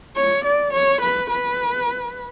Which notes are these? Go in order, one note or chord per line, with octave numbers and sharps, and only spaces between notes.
C#5
D5
C#5
B4
B4